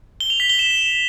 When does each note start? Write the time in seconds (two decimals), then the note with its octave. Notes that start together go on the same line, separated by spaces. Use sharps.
0.20 G7
0.30 F7
0.40 B6
0.50 G7
0.59 E7